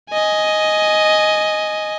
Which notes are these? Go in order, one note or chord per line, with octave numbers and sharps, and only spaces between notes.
D#5 G#5